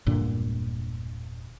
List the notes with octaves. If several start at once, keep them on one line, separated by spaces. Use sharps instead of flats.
E1 G2 A#2 D3